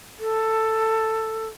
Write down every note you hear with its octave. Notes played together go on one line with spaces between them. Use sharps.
A4